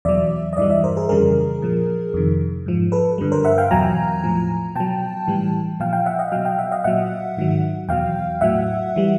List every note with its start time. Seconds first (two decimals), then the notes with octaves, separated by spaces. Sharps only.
0.05 E2 B2 F#3 D5 E5
0.53 D#5
0.57 G2 E3 G3 D5 E5
0.70 D5 E5
0.84 A#4 C5
0.97 G#4 A#4
1.09 F2 C#3 E3 G3 G#4 A#4
1.62 A#2 F3
2.14 F2 C3 D#3
2.66 G#2 F3
2.92 A4 B4
3.18 G2 D3 G3
3.32 A#4 C5
3.44 E5 F#5
3.58 F5 G5
3.71 E2 B2 F#3 G#5 A#5
4.24 A2 F3
4.75 B2 F#3 G5 A5
5.27 A2 E3 G3
5.80 A#2 F3 F5 G5
5.93 F5 G5
6.06 E5 F#5
6.19 D#5 F5
6.32 B2 F#3 F5 G5
6.45 F5 G5
6.58 E5 F#5
6.72 D#5 F5
6.84 A#2 F#3 E5 F#5
7.37 G#2 D#3 F#3
7.89 E2 B2 F#3 F5 G5
8.41 A2 F#3 E5 F#5
8.96 E3 G3